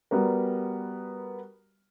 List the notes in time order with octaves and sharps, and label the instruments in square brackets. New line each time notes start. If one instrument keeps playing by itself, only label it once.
[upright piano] G3 B3 F#4 A#4